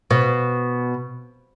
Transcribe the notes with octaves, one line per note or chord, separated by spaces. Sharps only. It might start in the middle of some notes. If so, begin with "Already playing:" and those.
B2